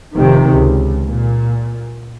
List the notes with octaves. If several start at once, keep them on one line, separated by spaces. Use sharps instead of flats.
F1 C3 D#3
C#2
A#2